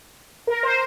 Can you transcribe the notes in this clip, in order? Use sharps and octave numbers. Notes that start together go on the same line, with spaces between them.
A#4
C5